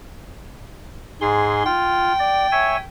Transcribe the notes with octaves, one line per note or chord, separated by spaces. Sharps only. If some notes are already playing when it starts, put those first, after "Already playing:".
G#2 G#4 C6
F4 G5
D5
C#5 E5 G#5